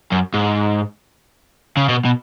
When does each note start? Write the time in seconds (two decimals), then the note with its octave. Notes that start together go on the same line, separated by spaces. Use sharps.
0.12 F#2
0.34 G#2
1.77 C#3
1.89 B2
2.05 B2